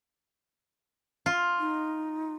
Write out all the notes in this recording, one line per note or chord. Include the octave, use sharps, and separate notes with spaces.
F4
D#4